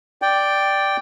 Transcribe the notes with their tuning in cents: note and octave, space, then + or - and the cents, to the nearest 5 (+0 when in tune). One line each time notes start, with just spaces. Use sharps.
D5 +0 G5 +0